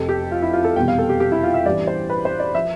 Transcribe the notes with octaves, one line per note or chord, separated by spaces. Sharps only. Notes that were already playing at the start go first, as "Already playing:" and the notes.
Already playing: F1 F2 C3 A4
G4
F4
E4
F4
A4
F1 E2 B2 G3 G5
F5
A4
G4
G4
E4
F4
E5
A1 G2 E3 G3 D5
C5
B4
C5
D5
F3 E5